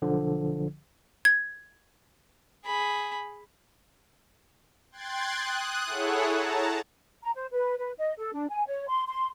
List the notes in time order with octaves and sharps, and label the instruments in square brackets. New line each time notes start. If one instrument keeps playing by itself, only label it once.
[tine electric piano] B1 D3 F3
[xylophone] G#6
[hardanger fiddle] G#4 B5
[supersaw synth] G5 C6 F#6 G#6 A6
D#6 F#6
E4 G#4 A4 C#5 F#5
A5 A#5
[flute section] A#5
C5
B4
B4
D#5
A4
D4
G#5
C#5
C6
C6